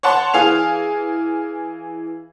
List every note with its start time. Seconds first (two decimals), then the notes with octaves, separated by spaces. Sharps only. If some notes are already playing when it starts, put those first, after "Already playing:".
0.03 C#5 F#5 A5 C6
0.34 E3 G#4 F5 F7